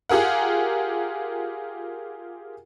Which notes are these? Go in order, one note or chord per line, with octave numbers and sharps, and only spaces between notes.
F4 G4 G#4 A#4 F#5